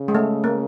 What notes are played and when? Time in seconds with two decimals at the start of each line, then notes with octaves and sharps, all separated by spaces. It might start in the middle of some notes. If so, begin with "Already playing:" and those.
Already playing: C#3
0.08 G#3
0.15 A3
0.44 A#3